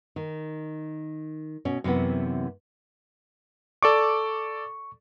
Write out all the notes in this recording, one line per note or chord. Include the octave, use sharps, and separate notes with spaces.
D#3
B2 C#4
F#2 C3 E3 B3
A4 D5 C#6 D6